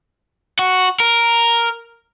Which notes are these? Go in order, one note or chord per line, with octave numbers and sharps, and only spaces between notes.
F#4
A#4